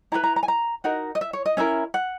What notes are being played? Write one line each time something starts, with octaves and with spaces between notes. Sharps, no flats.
E4 G#4 B4 A#5
A#5
A#5
G#5
A#5
D#4 F#4 A#4 F#5
D#5
E5
C#5
D#5
C#4 E4 A#4 E5
F#5